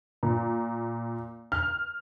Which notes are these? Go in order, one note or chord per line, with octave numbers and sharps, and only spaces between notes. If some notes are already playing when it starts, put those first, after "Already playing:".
A#2
F6